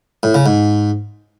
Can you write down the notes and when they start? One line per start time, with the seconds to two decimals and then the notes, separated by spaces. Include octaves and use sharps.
0.23 A2
0.34 C#3
0.46 G#2